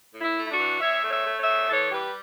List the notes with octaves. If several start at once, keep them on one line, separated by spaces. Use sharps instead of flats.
A2
E4
A3
E4
D4 F#4
E3
E2 C#5 E5
A3
C#5 E5
A3
C#5 E5
E2
E3 A4 C#5
G3 G4 B4